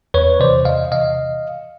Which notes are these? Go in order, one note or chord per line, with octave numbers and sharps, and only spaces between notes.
E2 B4 C#5
C3 E3 C5 D5
E2 D#5 F5
C3 E3 D#5 F5